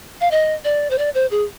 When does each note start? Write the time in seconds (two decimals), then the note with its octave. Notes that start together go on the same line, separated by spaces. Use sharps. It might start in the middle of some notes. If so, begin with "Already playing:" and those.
0.21 F5
0.31 D#5
0.65 D5
0.90 C5
0.98 D5
1.15 C5
1.31 G#4